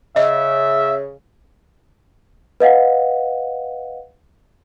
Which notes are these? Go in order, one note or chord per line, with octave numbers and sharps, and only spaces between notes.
C#3 D#5 E5
B4 D#5 F5 F#5